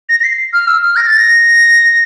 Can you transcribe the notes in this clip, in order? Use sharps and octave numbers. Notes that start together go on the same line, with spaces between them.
A#6
A#6
C7
F6
E6
F6
A#6
A6
A#6